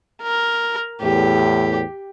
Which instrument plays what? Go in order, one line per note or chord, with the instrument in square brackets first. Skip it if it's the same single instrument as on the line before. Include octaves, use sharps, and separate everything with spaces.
[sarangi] A#4
[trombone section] E2 A2 [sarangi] G4